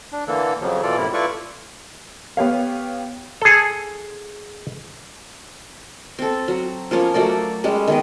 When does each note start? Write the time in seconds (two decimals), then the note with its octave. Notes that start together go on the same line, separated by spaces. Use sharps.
0.12 D4
0.28 D3 E3 A#3 A4
0.61 F2 C#3 F3 F#3
0.83 B2 E3 F4 A4 D5
0.97 F#2 A2 C3 E4
1.13 E4 F4 A4 B4 D5 C#6
2.37 B3 G4 C#5 F5
3.42 G#4 A4
6.19 C4 A4
6.48 F#3
6.91 F3 A#3 C#4 C#5
7.14 F#3 A3 A#3 D5
7.64 G3 G#3 C#4
7.87 D#3 B3 D#5